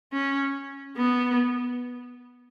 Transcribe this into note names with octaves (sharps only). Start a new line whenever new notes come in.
C#4
B3